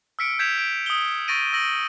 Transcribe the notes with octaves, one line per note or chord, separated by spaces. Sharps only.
E6 F6 B6 C#7 D7
E6 G6 G#6 B6 E7 F7
B6 D7
D#6 G7
C#6 A6 A#6 D7 D#7
E6 A#6 F#7